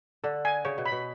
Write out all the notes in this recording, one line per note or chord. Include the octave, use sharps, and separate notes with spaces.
D3 A4
G#5
C#3 C#5
B2
B5
B2